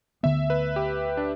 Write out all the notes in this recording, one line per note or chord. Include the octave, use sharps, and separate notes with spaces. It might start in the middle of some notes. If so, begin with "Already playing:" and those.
D2 D3 B3 E5
B4
G4
D4